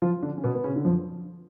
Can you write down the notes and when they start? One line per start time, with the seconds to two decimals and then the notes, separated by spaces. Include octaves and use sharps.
0.02 F3 F4
0.23 D3 D4
0.38 C#4
0.44 B2 B3
0.55 B3
0.64 C#3 C#4
0.76 D3
0.85 F2 F3